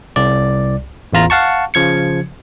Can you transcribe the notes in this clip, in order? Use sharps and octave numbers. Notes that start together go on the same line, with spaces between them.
C2 D5
A1 E2 F4 A#5
F5 F#5 A5 C#6
C#3 F3 G#6 C#7